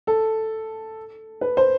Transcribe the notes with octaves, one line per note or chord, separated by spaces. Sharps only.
A4
B4
C5